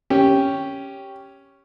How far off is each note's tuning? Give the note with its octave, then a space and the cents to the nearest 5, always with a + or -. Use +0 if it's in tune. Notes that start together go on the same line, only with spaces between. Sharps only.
C#4 +0 G4 +0